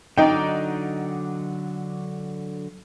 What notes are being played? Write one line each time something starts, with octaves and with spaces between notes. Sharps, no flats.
D3 F#3 D#4 D5 G5